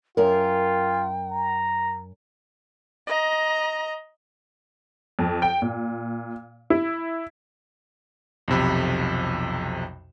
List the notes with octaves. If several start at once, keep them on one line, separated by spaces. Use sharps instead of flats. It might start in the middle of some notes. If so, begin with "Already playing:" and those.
F#2 F4 A#4 G5
A#5
D#5 A#5
F2
G5
A#2
E4
B1 F2 C3 B5